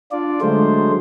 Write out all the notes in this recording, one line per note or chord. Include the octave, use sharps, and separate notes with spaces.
D4 F4 D5
D3 F#3 G#3 A3 C5